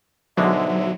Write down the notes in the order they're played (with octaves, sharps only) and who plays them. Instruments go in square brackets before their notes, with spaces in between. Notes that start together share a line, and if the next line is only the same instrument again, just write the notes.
[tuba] G#2 [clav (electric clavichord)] B2 D3 G#3 [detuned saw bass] F#3 [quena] E5